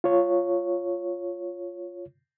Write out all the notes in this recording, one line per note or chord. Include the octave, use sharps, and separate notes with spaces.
F4 C#5